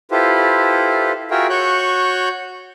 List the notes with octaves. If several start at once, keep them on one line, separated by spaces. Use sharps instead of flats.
E4 F4 G4 A4 B4 C5
F4 F#4 G#4 A#4 E5 G5
F#4 C#5 C#6 F#6 G6